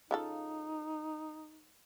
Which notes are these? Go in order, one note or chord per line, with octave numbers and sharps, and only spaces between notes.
C#3 D#4 F4 A4